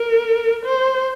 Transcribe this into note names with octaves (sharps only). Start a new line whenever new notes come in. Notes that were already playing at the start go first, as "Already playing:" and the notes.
Already playing: A#4
C5